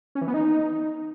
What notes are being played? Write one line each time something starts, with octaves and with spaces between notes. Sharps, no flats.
C#4
E3
B3
D#4